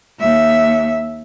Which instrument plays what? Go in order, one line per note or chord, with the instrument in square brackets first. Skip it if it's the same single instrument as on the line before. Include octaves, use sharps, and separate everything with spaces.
[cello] D#2 E5